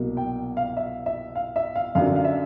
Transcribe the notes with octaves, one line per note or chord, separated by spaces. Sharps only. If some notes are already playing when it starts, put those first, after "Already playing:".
Already playing: C2 B2 F#3 A#3
G5
F5
E5
E5
F5
E5
F5
F#2 D3 F#3 F5
F5
E5